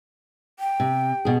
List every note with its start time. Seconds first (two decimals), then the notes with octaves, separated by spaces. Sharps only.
0.60 G5
0.80 C3
1.25 B2 G#4